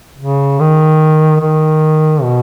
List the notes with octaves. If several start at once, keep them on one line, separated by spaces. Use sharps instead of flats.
C#3
D#3
D#3
B2